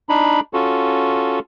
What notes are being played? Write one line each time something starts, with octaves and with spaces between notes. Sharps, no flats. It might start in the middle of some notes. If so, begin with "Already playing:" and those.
D4 D#4 B5
C#4 F4 F#4 A4